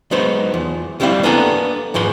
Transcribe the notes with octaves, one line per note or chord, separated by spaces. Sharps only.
F#3 G#3 B3 D#4 C5 C#5
E2 F3
D2 G3 C4 E4 F5
A#3 B3 D4 A4 G#5 A#5
D#2 G#2 F3 B4 C6